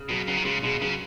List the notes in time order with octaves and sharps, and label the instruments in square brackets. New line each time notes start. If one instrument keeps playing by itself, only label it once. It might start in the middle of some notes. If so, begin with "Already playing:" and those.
Already playing: [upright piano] C#3
[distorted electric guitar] B2 [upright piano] F#3
[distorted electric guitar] C#3 [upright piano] F#3
[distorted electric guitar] D#3
[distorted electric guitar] C#3 [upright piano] G#3
[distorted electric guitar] B2 [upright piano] G#3
[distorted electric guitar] C#3 [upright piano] F#3